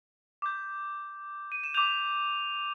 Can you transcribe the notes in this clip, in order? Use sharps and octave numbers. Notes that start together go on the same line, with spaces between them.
D6 G6
D#7
E7
D6 G6 F7